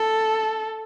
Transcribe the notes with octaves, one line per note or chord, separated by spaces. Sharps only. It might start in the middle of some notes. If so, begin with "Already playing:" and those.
Already playing: A4